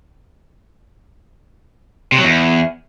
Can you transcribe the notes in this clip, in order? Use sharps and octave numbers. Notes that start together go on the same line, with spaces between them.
C3
F#3
E2